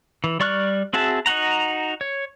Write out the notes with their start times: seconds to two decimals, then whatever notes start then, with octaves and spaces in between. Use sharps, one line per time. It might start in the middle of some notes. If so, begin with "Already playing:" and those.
0.24 E3
0.40 G3 D5 C#6 F6 F#6
0.93 C4 F#4 G#4 E5 A5
1.26 D#4 F#4 F#5 A#5
2.01 C#5